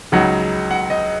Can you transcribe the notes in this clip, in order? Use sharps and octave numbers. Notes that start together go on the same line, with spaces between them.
C#2 C#3 F#3 D#4 F#5
F#5
D#5